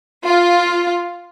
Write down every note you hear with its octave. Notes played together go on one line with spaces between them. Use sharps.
F4